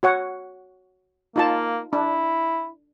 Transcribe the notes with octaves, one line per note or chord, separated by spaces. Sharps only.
F#4 C#5 F#5
A#3 D#4 F4 A5
D4 E4